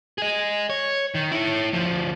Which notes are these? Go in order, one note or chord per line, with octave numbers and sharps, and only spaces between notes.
G#4 D#5
C#5
D#3
E4 C#5
D2 F3